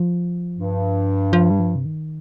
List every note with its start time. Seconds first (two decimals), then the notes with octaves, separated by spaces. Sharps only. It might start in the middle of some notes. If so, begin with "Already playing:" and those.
Already playing: F3
0.55 G2
1.33 F3
1.51 G3
1.59 F3
1.76 C3
1.85 D#3